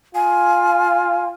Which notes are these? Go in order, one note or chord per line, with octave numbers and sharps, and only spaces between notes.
F4 G#5